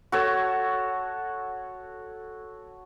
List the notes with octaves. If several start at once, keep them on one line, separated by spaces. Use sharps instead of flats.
F#4 A4 C#5